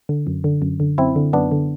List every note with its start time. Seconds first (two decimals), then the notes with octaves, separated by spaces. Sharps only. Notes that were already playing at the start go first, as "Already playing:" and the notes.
0.09 D3
0.27 F#2
0.44 D3
0.62 F#2
0.80 D3
0.98 F#2 C4 E4
1.16 D3
1.33 F#2 B3 D4
1.52 D3